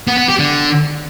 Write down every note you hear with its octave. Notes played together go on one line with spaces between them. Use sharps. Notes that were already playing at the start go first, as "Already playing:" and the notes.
B3
B3
G4
D3